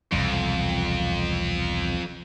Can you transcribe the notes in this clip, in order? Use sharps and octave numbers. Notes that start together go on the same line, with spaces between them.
E1 C2 F2 F3